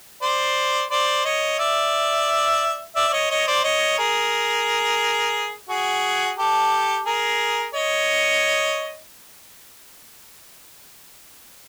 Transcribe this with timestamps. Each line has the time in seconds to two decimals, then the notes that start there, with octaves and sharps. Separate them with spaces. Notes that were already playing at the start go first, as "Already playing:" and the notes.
0.22 C5 D5
0.91 C5 D5
1.25 C#5 D#5
1.59 D5 E5
2.96 D5 E5
3.08 D5
3.13 C#5 D#5
3.31 C#5 D#5
3.47 C5 D5
3.64 C#5 D#5
3.99 G#4 A#4
5.69 F#4 G#4
6.38 G4 A4
7.06 G#4 A#4
7.74 C#5 D#5